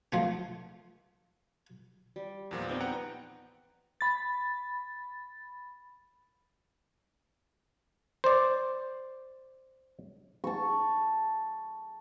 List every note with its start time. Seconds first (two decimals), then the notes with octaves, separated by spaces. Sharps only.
0.12 F3 A3 C4
2.16 G3
2.51 E2 A#2 F3
2.68 B3 C4 D#4
2.80 B4 C5 F#5 G5 A#5
4.01 B5 A6
8.24 C5 D5
10.44 A5 C#6